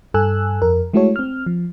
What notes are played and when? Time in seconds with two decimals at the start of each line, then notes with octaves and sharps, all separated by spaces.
0.14 G2 A4 G#5 E6 F#6
0.62 F2 A#4
0.94 G#3 A3 E4 F#4 A4 C#5
1.16 C4 F6
1.46 F3